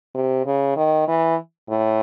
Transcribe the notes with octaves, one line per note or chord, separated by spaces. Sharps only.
C3
C#3
D#3
E3
A2